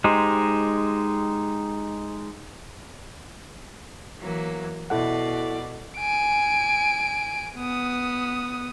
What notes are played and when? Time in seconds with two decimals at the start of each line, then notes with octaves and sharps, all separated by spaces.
0.04 G#3 D#4 G4 C5
4.19 E3 F#3 A#3
4.90 B2 E4 A4 D5 F#5
5.98 G#5 D7
7.58 B3 D#6